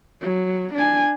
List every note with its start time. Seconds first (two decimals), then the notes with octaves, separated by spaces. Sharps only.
0.21 F#3
0.74 D4 G#5